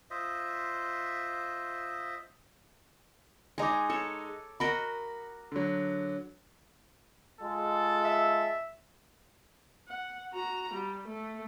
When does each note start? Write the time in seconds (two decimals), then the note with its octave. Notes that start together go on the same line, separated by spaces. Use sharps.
0.11 F4 C5 D#5 E5
3.58 G#3 D#4 G#4 A#5 D6
3.89 A4 C#5
4.60 F#4 A#4 D#5 B5
5.52 D3 F#3
7.41 G#3 F4 A4
8.04 E5
9.88 F#5
10.33 F#4 A#5
10.74 G3
11.08 A3